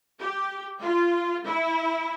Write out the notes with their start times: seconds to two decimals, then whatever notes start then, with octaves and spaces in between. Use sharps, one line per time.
0.19 G4
0.80 F4
1.45 E4